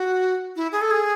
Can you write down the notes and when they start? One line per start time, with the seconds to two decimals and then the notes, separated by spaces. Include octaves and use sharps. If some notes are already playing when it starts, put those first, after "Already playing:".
Already playing: F#4
0.56 E4
0.72 G#4
0.81 A4
0.91 G#4